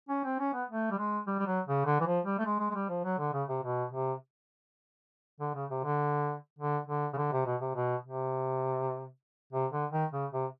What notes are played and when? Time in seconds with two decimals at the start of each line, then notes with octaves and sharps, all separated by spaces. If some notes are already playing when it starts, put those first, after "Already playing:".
0.09 C#4
0.24 C4
0.39 C#4
0.54 B3
0.69 A3
0.91 G3
0.98 G#3
1.27 G3
1.39 G3
1.46 F#3
1.67 C#3
1.86 D3
2.00 E3
2.06 F3
2.25 G3
2.39 A3
2.45 G#3
2.59 G#3
2.70 G#3
2.75 G3
2.89 F3
3.04 F#3
3.19 D3
3.33 C#3
3.49 C3
3.63 B2
3.92 C3
5.40 D3
5.55 C#3
5.70 C3
5.84 D3
6.58 D3
6.87 D3
7.13 C#3
7.17 D3
7.32 C3
7.46 B2
7.61 C3
7.75 B2
8.06 C3
9.53 C3
9.72 D3
9.92 D#3
10.12 C#3
10.32 C3